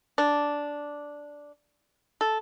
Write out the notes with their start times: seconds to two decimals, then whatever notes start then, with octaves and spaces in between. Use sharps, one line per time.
0.18 D4
2.21 A4